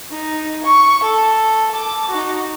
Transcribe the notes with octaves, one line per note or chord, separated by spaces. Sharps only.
D#4
C#6
A4
A5 D6
D#4 F#4